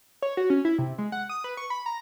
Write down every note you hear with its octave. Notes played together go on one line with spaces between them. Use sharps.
C#5
F#4
C#4
E4
C3
G#3
F#5
D#6
B4
C#6
B5
A#5